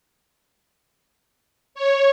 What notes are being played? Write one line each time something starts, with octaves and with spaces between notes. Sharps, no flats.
C#5